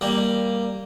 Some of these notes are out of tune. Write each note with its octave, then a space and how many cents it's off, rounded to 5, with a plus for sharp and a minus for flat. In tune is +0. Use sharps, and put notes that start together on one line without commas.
G3 +0 A#3 +0